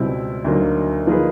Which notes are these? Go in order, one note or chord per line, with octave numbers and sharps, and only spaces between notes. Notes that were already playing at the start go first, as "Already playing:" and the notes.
Already playing: C#2 B2 G3 C4 E4
D2 D3 F#3 A#3 D#4
F3 A#3 D#4 G#4 B4